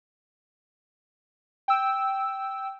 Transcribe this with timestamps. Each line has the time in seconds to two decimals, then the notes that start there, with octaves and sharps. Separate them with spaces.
1.68 G5 E6